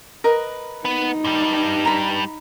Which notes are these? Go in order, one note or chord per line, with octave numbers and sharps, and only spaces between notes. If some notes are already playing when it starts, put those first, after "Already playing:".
A#4 B4 D#5
B3 D#4
G2 G3
A#5 B5